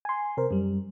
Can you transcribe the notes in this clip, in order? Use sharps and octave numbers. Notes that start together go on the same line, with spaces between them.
G#5 C6
C3 A#4 C5
F#2 G3